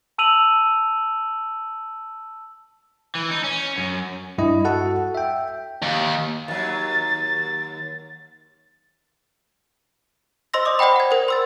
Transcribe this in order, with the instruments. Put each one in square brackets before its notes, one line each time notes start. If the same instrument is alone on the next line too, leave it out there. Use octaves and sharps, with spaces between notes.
[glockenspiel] A5 E6 D#7 F7 F#7
[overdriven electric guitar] E3
D#4
C#4
F#2
[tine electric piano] G2 E4 D#5
F#4 A4 F#5 A5
E5 G5
[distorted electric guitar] D#2
[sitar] D#2 F#3 [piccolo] A6
[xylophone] C5 D#5 C6 E6 A#6
D5 D#5 D6 D#6
C5 D5 F#5 G5 B5
F#5 G#6
A#4 C5
C6 E6 A6